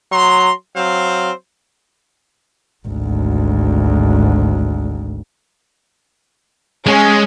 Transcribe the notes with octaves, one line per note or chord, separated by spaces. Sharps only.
F#3 A#5 C6
F#3 C4 C5 F5
G#1 D2
G#3 C#4